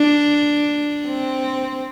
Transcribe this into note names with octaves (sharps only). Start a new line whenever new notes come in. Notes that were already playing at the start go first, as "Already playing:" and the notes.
Already playing: D4
C4